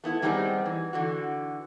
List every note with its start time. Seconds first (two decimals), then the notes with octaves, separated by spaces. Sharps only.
0.04 A3 B3 E4 B4
0.22 D#3 G3 B3 C4 D#4 G#4
0.66 E3
0.93 D3 E3 F#4